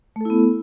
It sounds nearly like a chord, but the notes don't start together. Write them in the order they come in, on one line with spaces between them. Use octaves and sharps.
A3 A4 E4 B3